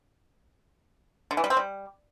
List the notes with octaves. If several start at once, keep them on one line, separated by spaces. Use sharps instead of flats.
D3
E3
G3
C4
G3